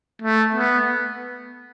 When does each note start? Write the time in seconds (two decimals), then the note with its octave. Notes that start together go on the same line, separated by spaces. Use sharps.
0.22 A3
0.54 B3